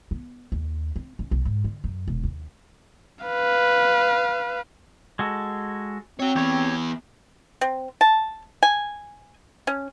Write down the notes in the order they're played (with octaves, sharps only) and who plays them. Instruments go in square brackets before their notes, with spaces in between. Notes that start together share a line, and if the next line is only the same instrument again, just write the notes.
[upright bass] B3
D#2
C4
C#4
B1
G#2
D3
F#2
E1
D#2
[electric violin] B4 F5
[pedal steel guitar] G#3 F#4 A4
[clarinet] C4 [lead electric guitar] F#4 C#5
[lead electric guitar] E3 B3 [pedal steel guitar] G4 C#5
[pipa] C4
A5
G#5
C#4